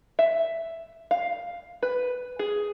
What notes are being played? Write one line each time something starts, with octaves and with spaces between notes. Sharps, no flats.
E5
F5
B4
G#4